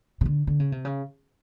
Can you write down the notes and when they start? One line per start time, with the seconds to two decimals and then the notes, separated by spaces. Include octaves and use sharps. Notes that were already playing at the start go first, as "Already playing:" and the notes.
0.21 C#3
0.25 D3
0.47 D3
0.60 C#3
0.72 C3
0.85 C#3